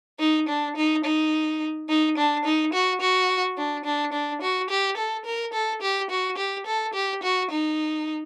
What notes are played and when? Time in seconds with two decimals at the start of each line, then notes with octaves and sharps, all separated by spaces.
0.19 D#4
0.48 D4
0.76 D#4
1.04 D#4
1.89 D#4
2.17 D4
2.45 D#4
2.73 F#4
3.01 F#4
3.58 D4
3.85 D4
4.13 D4
4.42 F#4
4.70 G4
4.97 A4
5.25 A#4
5.53 A4
5.82 G4
6.10 F#4
6.37 G4
6.66 A4
6.94 G4
7.23 F#4
7.51 D#4